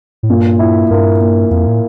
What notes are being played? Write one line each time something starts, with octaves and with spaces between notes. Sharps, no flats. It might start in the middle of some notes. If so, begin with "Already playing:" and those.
A2
G2 A#2
E4
G2 A#3
A#3
F2 A#3
A2